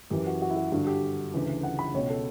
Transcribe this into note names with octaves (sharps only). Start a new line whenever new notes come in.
F#2 E3 G4
F#4
F#4
E4
F#4
G2 D3 F#4
G4
D2 C#3 E3
F#5
B5
C#2 B2 C#5
A4